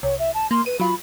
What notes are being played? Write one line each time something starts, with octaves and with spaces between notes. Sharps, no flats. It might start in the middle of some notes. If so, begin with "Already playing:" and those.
C2 C#5
E5
A5
A#3 C6
B4 D#7
F#3 F4 B5